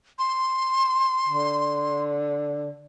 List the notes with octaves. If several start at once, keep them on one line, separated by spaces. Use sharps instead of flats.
C6
D3